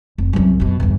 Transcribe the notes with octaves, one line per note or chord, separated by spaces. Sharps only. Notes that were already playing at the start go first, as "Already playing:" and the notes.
F1
C2 F#2
F#2 B2
G1 E2